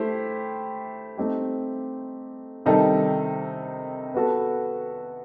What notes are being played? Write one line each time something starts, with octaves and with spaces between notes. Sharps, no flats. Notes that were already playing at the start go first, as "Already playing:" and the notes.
Already playing: A3 E4 G4 C5
A3 C4 D#4 G4
C3 D#3 G3 D#4 A4
B3 F#4 A4